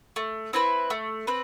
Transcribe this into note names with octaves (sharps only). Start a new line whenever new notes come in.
A3
C4 E4 B4
A3
C4 B4